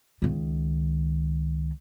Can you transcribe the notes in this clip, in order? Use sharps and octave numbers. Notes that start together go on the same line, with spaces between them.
C#2 D#3